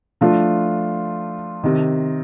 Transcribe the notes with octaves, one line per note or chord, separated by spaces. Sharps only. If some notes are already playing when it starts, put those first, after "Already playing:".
F3 A3 D4 F4
C3 D#3